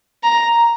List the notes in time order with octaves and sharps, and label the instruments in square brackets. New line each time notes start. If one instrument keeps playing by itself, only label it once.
[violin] A#5